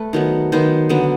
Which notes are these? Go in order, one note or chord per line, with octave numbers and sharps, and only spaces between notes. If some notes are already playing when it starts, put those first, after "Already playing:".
Already playing: A3 B4
D#3 F#3 B3
D#3 F#3 B3 C5
D3 F#3 B3